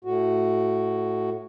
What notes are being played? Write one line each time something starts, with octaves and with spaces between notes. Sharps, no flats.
A2 F#4